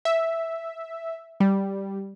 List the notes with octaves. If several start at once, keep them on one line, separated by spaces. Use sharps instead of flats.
E5
G3